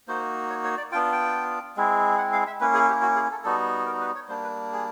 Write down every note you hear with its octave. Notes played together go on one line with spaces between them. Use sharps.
A#3 D#4 F#4 C5
C#5
C#5
D5
B3 D4 F4 G5
G5
G#3 C4 E4
F#5
F5
E5
A#3 C#4 E4 B4
G#4
G4
F#4
G#4
A4
G3 B3 D#4 F#4 A4
A#4
B4
C#5
G3 A#3 D4 C5
B4
G#4